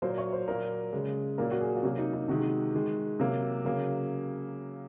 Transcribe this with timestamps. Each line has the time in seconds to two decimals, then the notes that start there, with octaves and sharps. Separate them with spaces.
0.02 A#2 F#3 A#3 C5
0.18 C#5
0.32 C5
0.48 A#2 F#3 A#3 A#4
0.93 C#3 G#3
1.38 A#2 F#3 A#3 A#4
1.51 F#4
1.61 G#4
1.76 F4
1.83 C3 F#3 A#3 F#4
1.98 D#4
2.14 D#4
2.28 C3 D#3 G#3 F#4
2.74 D#3 G#3
3.20 C3 F#3 A#3
3.65 C#3 F#3 A#3